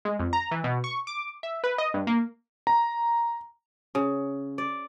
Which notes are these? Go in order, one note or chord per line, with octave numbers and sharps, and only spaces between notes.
G#3
F2
A#5
E3
B2
C#6
D6
E5
B4
D#5
G2
A#3
A#5
C#3
D5